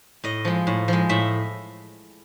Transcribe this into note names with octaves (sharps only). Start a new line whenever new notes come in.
A2 D#5
F3 G#3
A2
F3 G#3
A2 E5